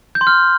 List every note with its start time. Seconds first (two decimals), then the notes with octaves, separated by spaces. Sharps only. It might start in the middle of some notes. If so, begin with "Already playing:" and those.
0.15 G6
0.21 C6
0.27 F6